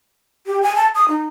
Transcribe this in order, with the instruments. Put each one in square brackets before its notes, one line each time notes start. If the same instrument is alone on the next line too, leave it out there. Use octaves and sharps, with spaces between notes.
[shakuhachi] G4
G#5
A5
D#6
D#4